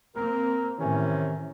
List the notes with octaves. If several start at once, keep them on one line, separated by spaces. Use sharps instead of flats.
A#3 C4 A#4
A2 C3 D#3 E3 C#4